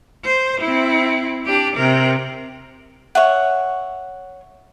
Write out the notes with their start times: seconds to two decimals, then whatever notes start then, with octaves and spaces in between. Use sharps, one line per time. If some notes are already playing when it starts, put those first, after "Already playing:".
0.24 C5
0.61 C4 E4
1.46 D4 G4
1.76 C3 A#4
3.15 C#5 E5 F#5